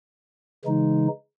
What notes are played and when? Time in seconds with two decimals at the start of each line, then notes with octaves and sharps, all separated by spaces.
0.65 C#3 E3 G#3 D#4